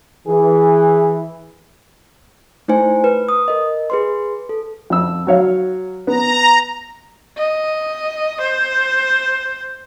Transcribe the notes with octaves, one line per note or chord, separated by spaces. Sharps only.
E3 G#4
A3 D#4 E4 C5 G#5
B4
D#6
A#4 D#5
G#4 B4 C6
A4
F2 E6
F#3 C#5 F5
B3 A#5
D#5
C5